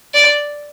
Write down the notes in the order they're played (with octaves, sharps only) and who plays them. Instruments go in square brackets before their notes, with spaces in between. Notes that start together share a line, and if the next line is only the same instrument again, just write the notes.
[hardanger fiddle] D5